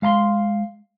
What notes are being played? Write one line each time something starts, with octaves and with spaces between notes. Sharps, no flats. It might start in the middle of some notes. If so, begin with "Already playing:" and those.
G#3 F5 A#5 C6